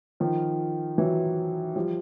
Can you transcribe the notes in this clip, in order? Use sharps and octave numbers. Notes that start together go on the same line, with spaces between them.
D#3 F3
E3 F#3
F3 G3